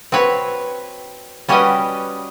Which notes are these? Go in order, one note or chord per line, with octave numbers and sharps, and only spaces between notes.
C4 F#4 B4 C#5
G3 C#4 F#4 G4 B4 D#5